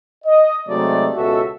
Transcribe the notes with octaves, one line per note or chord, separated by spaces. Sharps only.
D#5
C3 F#3 G#3 A3 D#4 D5
C#2 B2 F#4 A4 E5